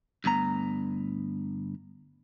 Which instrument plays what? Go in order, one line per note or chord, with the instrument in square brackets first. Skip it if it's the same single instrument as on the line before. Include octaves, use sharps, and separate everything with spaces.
[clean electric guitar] D2 G2 B3 A#5